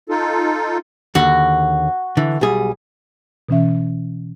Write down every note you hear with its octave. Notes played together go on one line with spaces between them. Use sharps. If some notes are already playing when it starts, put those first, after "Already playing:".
D#4 F4 A4
D#2 D3 F#4
D3 E3
B1 G3 G#4
B2 E3 C#4 E5